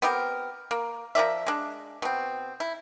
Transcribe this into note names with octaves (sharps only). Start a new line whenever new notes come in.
B3 C4 G4 A#4
A#3
F3 A#4 D5 E5
G#3 D4
B2 C4
E4